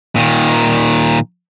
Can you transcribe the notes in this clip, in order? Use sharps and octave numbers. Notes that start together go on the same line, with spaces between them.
A#2 D#3